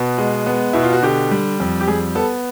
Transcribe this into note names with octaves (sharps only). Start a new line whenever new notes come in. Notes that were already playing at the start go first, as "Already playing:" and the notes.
Already playing: B2 B3
G#3
B3
B2 E4
F4
F#4
D3 G4
G3
F2
G4
G3 G#4
B3 A4